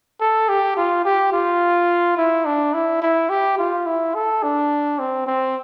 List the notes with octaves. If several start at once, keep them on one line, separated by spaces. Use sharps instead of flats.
A4
G4
F4
G4
F4
E4
D4
E4
E4
G4
F4
E4
A4
D4
C4
C4